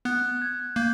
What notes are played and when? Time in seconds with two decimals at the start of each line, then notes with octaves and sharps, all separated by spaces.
0.05 B3 F#6
0.42 G#6
0.76 A#3 G6